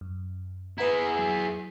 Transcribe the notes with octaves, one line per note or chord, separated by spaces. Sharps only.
F#2
E4 G#4 B4 F#5 A#5
F#3